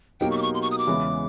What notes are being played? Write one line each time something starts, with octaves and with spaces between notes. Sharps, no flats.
B2 F#3 A#3 D#4 G4 G5
C#6
D6
C#6
C6
C#6
D#6
D6
E2 C#3 E3 G#3 B3